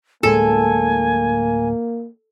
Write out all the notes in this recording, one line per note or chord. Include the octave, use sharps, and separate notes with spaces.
D1 A2 G#3 A#3 A4 G#5